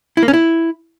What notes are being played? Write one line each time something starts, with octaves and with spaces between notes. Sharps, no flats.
E4
A#3
C#4
E4